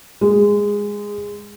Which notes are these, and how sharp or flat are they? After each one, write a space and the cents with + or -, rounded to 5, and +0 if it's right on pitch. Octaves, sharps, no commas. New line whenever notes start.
G#3 -15